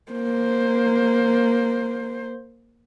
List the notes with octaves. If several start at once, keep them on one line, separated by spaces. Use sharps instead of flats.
A#3 C5